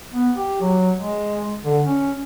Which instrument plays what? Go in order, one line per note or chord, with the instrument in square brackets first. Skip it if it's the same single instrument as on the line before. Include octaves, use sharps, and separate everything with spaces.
[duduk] B3
G4
F#3
G#3
D3
C#4